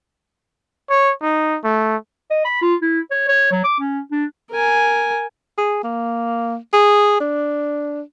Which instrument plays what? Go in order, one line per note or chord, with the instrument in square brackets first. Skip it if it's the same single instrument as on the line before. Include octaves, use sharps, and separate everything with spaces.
[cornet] C#5
D#4
A3
[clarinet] D#5
B5
F4
E4
C#5
C#5
F#3
D6
C#4
D4
[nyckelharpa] A#4 G#5
[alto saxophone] G#4
A#3
G#4
D4